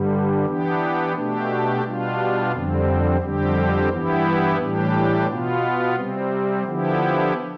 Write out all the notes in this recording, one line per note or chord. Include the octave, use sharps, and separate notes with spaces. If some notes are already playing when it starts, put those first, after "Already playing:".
Already playing: G2 D3 G3
E3 B3 D4 G4
B2 A3 D4 G4
B2 G3 D4 F4
F2 D3 G3 C4
F2 D3 G3 C4 G4
G2 E3 B3 E4 G4
A2 E3 G3 D4 G4
B2 B3 F4
C3 G3 C4
D3 F3 B3 E4 G4